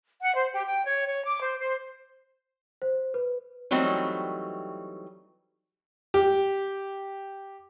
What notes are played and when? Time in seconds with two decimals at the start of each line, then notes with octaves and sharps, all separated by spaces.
0.21 F#5
0.35 C5
0.53 G4
0.66 G5
0.86 C#5
1.06 C#5
1.24 D6
1.41 C5
1.58 C5
2.82 C5
3.14 B4
3.71 E3 F#3 G3 A3 C4 D#4
6.14 G4